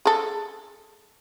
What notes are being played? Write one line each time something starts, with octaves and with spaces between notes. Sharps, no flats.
G#4 A4